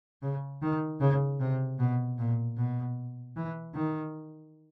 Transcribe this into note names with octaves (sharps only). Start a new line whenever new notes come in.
C#3
D#3
C#3
C3
B2
A#2
B2
E3
D#3